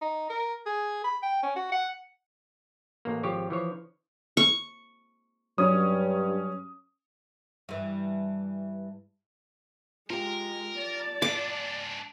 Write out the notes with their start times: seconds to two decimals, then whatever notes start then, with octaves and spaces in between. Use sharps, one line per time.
0.01 D#4
0.30 A#4
0.66 G#4
1.04 B5
1.23 G5
1.43 C#4
1.56 F#4
1.72 F#5
3.05 A1 A#3
3.23 G#1 F3 G4 C#5
3.50 E3 F3 C#5
4.37 C#6
5.58 G2 F#3 C#4 C#5 D#6
7.69 G2 E3
10.10 G#3 F4 G4 A#4
10.78 D5 A5
11.22 G#2 D4 D6